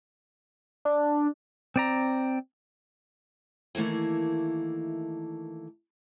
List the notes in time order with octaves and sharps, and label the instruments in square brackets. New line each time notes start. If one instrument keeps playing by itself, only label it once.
[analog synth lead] D4
[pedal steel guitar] C4 D5 A#5
[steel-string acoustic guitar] D#3 E3 A3 A#3 E4